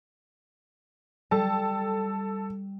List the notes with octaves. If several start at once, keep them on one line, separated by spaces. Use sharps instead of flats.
G3 A4 A5